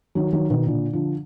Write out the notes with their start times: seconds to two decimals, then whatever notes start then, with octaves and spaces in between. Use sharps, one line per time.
0.15 D#3 F#3
0.32 D#3 F#3
0.50 B2 D#3
0.67 A#2 D3
0.93 D3 F3